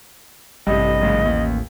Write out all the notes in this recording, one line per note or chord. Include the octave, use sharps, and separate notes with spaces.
A1 G2 C3 D#5
F#1 G#2 C#3
D#2